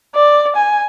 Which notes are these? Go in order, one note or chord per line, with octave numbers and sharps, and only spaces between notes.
D5
G#5